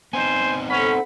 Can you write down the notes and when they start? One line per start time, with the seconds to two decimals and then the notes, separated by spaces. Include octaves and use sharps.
0.13 B3 C4 D#4 C5 G#5
0.70 C#4 A4 C5 F#5 B5